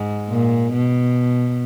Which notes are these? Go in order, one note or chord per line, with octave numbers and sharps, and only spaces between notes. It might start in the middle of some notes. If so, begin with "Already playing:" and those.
Already playing: G#2
A#2
B2